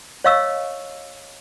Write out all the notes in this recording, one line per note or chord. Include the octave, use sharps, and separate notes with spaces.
C#5 D#5 F5 C#6 E6